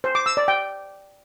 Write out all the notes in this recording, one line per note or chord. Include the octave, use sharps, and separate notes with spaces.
C5
D6
E6
D5
G5